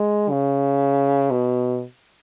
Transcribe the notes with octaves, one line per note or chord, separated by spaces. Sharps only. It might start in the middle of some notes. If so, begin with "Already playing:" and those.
Already playing: G#3
C#3
B2